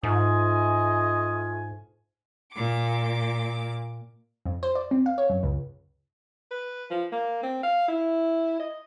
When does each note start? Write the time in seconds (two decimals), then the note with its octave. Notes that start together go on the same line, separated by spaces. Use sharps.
0.03 G#2 A3 F4 D#5 G#5
2.51 A#2 D6
4.46 F2
4.63 C5
4.75 D5
4.91 C4
5.06 F5
5.18 C#5
5.30 F#2
5.43 C#2
6.51 B4
6.91 F3
7.12 A#3
7.43 C4
7.63 F5
7.88 E4
8.60 D#5